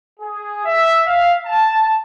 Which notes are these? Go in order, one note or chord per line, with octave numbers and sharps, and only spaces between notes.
G#4
E5
F5
A5